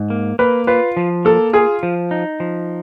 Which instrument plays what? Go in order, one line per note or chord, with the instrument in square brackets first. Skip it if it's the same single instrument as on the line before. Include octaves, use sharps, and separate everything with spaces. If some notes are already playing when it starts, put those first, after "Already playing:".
Already playing: [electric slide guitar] G#2
A#3
[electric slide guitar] A#3 [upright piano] B4
[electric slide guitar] F4 [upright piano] B4
[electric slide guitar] F3
[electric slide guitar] A#3 [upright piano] A4
[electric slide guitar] F4 [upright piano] G#4
[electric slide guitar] F3
D#4
F3